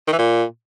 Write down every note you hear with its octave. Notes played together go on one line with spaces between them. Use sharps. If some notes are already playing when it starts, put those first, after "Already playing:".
D#3
E3
A#2